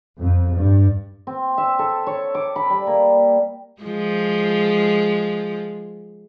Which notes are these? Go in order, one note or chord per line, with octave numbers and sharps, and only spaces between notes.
F2
G2
C4
E5
A4
C#5
D6
B5
G3
A#3
F3 G#3